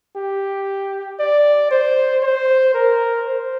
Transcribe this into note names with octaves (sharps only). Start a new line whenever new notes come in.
G4
D5
C5
C5
A#4
C5